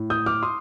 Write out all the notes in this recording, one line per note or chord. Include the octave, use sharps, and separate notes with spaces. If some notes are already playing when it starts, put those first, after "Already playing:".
Already playing: A2
D#6 G6
D6 F6
C6 D#6